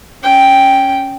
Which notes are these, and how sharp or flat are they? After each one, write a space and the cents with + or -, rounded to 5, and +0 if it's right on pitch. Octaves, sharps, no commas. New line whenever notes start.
C#4 +0 G5 +0